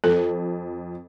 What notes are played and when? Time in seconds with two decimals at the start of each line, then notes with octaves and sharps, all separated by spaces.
0.04 F2 A4